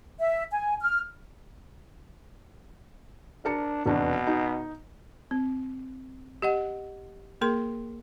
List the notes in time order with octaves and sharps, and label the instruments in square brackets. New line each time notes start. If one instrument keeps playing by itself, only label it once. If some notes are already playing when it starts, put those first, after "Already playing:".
[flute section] E5
G#5
F6
[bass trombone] D4 [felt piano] A#4 A5 C#7
[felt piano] F1 E2 D4 [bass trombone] B2
[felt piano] D#4
[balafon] C4
G4 D#5 F#5
A#3 G#4 A#4 C6